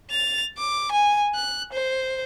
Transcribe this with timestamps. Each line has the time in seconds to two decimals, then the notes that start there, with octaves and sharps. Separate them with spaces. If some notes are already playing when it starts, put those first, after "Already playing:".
0.11 A6 F7
0.58 D6
0.92 G#5
1.35 F#6
1.73 C5